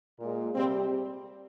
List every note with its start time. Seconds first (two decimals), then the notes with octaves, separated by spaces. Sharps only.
0.18 A#2 G#3
0.53 C3 G3 C4